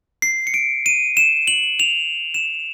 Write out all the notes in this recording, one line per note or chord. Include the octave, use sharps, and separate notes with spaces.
C7
C#7
D7
D#7
E7
F#7
F7
E7